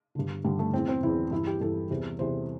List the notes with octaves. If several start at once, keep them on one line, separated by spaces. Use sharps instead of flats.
G2 D3
G2 D3 G3
A3
E2 E3 C4
C4
E2 E3 E4
G2 E3 E4
G4
G2 E3 A4
E2 C3 E3
E2 C3 E3 C5